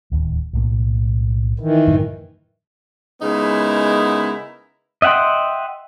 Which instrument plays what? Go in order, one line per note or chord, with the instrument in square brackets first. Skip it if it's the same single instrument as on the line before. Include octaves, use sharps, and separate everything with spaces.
[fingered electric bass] D1 D#2
B1 A2 A#3
[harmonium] D#3 E3
[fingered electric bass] F#2 A2 D3
[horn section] C#3 G#3 B3 D#4 E4 A#4
[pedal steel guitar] D#5 E5 F#5 G5 C6